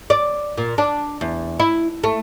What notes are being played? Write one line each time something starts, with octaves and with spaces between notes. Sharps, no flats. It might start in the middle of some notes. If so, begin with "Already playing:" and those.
D5
A#2
D4
E2
E4
A3